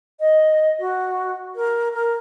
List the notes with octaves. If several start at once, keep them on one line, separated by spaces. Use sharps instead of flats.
D#5
F#4
A#4
A#4